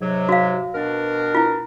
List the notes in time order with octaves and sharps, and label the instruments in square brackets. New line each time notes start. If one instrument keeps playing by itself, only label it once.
[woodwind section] G#2 C3 F#3
[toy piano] F#4 F5
[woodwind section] B2 D4 A#4
[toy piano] E4 F4